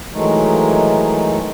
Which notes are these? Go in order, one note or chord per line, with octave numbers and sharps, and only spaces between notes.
D#3 E3 F#3 G#3 A3 D#4